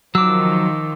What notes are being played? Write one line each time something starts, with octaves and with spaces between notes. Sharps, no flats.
D#3 F3 F#3 D6 E6